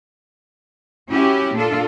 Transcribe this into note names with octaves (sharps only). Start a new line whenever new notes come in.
C#4 E4 F#4 G4
A#2 D4 F4 A4